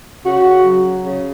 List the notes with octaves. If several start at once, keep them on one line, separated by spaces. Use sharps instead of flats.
C#3 F#4
F#3
C#3